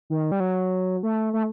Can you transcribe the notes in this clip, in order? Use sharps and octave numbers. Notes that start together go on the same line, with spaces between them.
D#3
G3
F#3
A3
A3